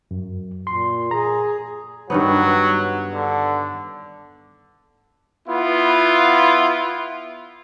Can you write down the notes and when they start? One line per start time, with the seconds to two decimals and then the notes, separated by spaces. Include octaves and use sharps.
0.11 F#2
0.67 A#2 C6
1.11 G#4 A#5
2.10 G2 D#3 F#3 B3
3.14 D3
5.48 B3 E4 F4